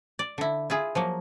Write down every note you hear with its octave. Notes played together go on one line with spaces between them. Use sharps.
D5
D3 E4
E4 F4 G#4
F3 F#3 A#3